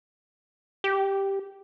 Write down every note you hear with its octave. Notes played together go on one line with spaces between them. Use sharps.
G4